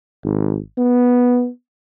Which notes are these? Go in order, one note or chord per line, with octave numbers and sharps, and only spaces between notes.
G#1
B3